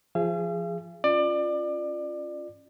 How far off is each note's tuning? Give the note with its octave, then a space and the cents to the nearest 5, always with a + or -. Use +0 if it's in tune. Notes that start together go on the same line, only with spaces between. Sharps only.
F3 -15 G#4 -5 F5 -45
C#4 +0 F4 +0 D5 +25